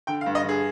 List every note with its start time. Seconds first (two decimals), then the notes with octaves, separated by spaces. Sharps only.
0.07 D3 G5
0.21 F5
0.26 G2
0.35 D#5
0.44 D3 G#4